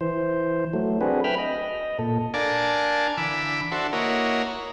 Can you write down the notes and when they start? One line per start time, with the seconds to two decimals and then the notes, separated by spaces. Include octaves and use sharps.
0.01 E3 C5
0.73 F#3 A3
1.01 C4 D4 F#4 G#4 B4
1.24 B4 E5 G5 B5 F6
1.38 D#5
1.99 A#2 A4
2.34 D4 A#4 D5 F5 G#5 A5
3.17 D3 E3 B5 D6 E6
3.72 D4 F#4 A4 C5 E5
3.93 A#3 E4 F#4 A#4 C#5 D#5